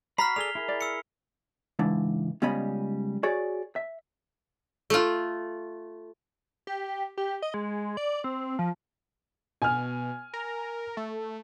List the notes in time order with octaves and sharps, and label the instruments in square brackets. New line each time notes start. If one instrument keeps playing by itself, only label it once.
[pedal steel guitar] F#4 B5 [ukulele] A#5 [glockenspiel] F6 B6 C7
[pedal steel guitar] G#4 A4 D5 [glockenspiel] F7 G7
[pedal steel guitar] E4 G#4 A#4
[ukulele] D5
[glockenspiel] E6 C#7
[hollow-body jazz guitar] C#2 G#2 E3 D4
C#2 G3 B3 C#4 D#5 B5
F#4 G#4 C#5 D5
E5
[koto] A3 F4
[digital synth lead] G4
G4
D#5
G#3
D5
C4
F3
[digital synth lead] B2 [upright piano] G#5 F6
[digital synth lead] A#4
A3